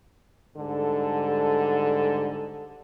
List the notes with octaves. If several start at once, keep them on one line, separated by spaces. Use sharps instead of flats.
G#2 D3 G3 A4